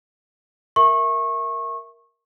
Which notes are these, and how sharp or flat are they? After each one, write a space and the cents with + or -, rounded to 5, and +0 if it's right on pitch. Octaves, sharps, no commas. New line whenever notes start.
A#4 +0 E5 +0 C#6 -25